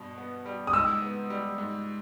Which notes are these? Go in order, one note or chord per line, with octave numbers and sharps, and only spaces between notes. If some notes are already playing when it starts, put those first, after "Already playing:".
Already playing: G2 B2
B3
G3
D#6
G#2 E6
B3
G3
G#2